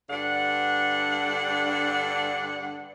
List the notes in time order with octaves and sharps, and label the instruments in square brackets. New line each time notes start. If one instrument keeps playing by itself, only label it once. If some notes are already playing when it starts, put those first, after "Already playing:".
[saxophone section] G2 D3 D4 F#5